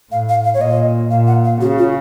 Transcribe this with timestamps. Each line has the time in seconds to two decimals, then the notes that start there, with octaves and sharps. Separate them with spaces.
0.11 A2 F5
0.29 F5
0.45 F5
0.54 C#5
0.61 A#2 D#5
1.11 A#2 F5
1.27 F#5
1.44 F5
1.61 C#3 F#4
1.78 F4